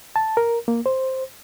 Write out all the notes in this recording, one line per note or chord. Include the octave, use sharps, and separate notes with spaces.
A5
A#4
A#3
C5